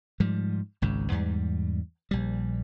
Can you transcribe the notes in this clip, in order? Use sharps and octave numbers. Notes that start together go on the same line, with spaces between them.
G#2 F3 G3
G#1 C#2 G#2
E2 G#2 G3
A#1 G3